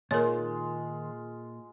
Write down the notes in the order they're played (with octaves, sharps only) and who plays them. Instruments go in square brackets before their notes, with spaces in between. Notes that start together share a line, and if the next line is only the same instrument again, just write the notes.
[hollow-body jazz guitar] A#2 [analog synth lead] D#3 [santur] G#3 F4 [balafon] A#4 C#5